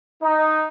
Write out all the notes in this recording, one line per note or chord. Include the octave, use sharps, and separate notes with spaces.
D#4